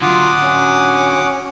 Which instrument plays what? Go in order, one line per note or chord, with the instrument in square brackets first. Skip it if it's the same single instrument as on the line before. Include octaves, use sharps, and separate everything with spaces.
[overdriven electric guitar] D3 F#3 [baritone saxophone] F4 [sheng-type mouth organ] F#5 D6 D#6
[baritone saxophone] C#4